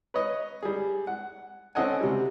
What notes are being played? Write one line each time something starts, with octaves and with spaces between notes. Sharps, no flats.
B4 C#5 D#5
G3 G#4
F#5
C4 C#4 A4 D#5 F#5 G#5
C3 G3